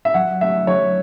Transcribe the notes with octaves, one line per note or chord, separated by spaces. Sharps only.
E5
F#3 F#5
A3 E5
F#3 C#5